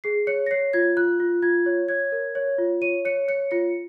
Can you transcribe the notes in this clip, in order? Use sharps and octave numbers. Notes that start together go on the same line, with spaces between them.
G#4 C7
C#5 C#7
A#6
C#5 C7
F4 G#6
F4 F#6
F4
F4 G#6
C#5
C#5 G#6
A#4
C#5
F4
C#5 D#7
C#5 C#7
C#5 C#7
F4 C#7